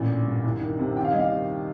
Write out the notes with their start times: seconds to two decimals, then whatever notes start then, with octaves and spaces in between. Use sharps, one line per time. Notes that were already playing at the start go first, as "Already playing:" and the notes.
Already playing: A1 A#2
0.09 D3
0.26 G2
0.44 C2
0.61 D#3
0.79 C3
0.96 D#2 G5
1.05 F5
1.12 G3 D#5
1.19 F5
1.32 D#3